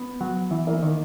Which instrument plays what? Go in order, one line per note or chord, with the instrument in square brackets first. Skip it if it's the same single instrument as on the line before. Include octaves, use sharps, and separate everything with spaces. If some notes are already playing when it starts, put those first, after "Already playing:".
Already playing: [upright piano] B3
[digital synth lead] F#3
E3
[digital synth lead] E3 [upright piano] A#3
[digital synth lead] D#3